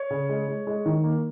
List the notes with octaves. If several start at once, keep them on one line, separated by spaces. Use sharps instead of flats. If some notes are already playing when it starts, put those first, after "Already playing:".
Already playing: C#5
C#3
G#3
G#3
G#3
D#3
A#3